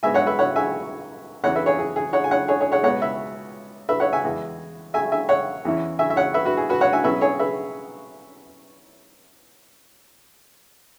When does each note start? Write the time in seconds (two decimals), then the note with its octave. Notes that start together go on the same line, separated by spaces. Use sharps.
0.03 G#2 G#3 B3 E5 G#5
0.14 C#5 F#5
0.27 B4 E5
0.39 C#5 F#5
0.56 E5 G#5
1.43 E2 E3 C#4 C#5 F#5
1.56 B4 E5
1.66 G#4 C#5
1.79 G#4
1.96 G#4
2.13 C#5 F#5
2.24 G#5
2.31 C#5 F#5
2.48 G#4 C#5
2.61 G#4 C#5
2.72 C#5 F#5
2.83 C#2 B2 B3 C#5 F#5
3.02 B4 E5
3.89 B4 E5
4.00 C#5 F#5
4.13 E5 G#5
4.24 E2 E3 G#3
4.94 E5 G#5
5.12 E5 G#5
5.29 C#5 F#5
5.65 E2 E3 C#4 E4
5.99 E5 G#5
6.10 E5
6.16 C#5 F#5
6.34 B4 E5
6.45 F#4 B4
6.57 G#4
6.69 F#4 B4
6.81 C#5 F#5
6.93 E5 G#5
7.04 B2 F#3 C#4 E4 B4 E5
7.21 G#4 C#5
7.39 B4 E5